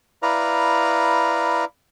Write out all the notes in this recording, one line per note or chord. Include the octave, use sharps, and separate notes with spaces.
E4 B4 D5 F5 A#5